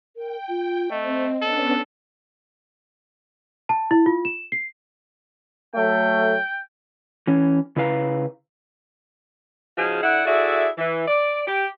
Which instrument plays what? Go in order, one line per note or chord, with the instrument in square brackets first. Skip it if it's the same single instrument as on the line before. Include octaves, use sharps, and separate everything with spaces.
[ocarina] A#4 [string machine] G5
[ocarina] F4
[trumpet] A3 [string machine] C4 [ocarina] D#5
[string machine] B3 C#4 D4 [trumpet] A4
[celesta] A5
E4
F4
E7
C7
[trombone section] F#3 A3 [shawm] G5
[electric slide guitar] E3 C#4
C#3 E4 B4 F5 A#5
[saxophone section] C#3 F3 D#4 F#4 G#4
D3 E4 D5 F#5
E4 F#4 G#4 A4 D5 E5
E3
D5
G4